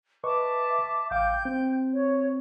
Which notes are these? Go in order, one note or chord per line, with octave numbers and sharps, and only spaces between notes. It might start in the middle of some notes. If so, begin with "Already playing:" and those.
B4 D#5 E5 A5 C#6 D6
A1 F5 G5 D6 G6
C4
C#5